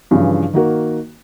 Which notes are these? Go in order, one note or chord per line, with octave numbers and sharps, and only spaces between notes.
G2 C#3 E3 F3
D#3 A#3 F#4 A#4